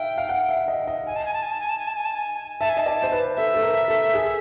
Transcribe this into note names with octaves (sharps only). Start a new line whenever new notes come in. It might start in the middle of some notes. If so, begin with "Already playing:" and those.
Already playing: E5 F5 G5
F5
F#5
E5
D#5
D#5
G#5
A5
G#5
A5
G#5
A5
G#5
A5
G#5
A5
G#5
A5
G#5
E5 A5
G#5
D#5 A5
D5
C5
B4
A4 E5
A4
A#4
A4
G#4